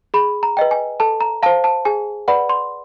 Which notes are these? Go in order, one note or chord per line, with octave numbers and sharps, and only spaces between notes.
G#4 B5
A#5
B4 D#5 G5
G#5
A4 A5
A#5
C5 F5 A5
A5
G#4 G#5
B4 D5 F#5 B5
C6